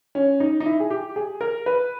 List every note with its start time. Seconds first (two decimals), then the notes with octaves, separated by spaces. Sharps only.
0.15 C#4
0.40 D#4
0.60 D#4
0.66 E4
0.80 G#4
0.90 G4
1.16 G#4
1.41 A#4
1.66 B4